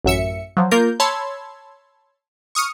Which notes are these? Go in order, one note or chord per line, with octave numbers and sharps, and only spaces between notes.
A1 F#2 E5 C#7
F3 F#3
A#3 F4 A#4 G6
C#5 A5 B5 C6 E6 G#6
C#6 D#6 F6 C#7